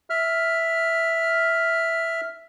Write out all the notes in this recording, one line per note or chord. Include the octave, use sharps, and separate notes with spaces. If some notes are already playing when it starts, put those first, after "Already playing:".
E5 F6